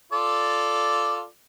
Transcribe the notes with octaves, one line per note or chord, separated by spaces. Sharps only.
F4 A4 D5